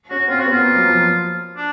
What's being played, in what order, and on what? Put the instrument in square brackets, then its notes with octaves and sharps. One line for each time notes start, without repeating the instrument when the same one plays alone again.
[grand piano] C#4 [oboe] F#4
[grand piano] C4 [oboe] F4
[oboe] F#4
[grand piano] B3
[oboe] F4
[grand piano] A#3
F#3
F3
[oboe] D4